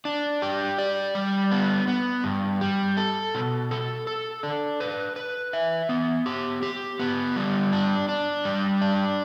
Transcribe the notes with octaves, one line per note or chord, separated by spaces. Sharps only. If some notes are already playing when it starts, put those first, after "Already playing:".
D4
G4
D5
G3
B3
B3
G2
G3
A4
B2
A4
A4
D4
B4
B4
E5
B3
G4
G4
B3
G3
D4
D4
G3
D4